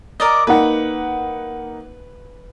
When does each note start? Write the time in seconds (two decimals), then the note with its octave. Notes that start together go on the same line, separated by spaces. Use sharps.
0.20 A#4 D5 D#5
0.47 A#3 D#4 B4 F#5